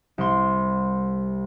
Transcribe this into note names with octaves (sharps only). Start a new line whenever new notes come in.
C2 C6